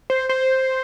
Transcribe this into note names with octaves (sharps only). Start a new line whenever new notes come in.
C5
C5